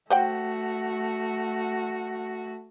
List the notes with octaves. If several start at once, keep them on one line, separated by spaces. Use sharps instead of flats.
A3 F#4 C5 F#5 G5